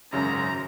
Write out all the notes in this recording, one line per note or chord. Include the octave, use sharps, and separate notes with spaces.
G#1 F#2 C#3 F#3 A#5